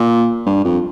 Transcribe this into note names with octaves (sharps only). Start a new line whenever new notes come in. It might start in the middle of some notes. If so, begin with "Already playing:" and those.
Already playing: A#2
G2
F2